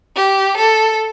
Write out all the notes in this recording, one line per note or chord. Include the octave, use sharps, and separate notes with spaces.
G4
A4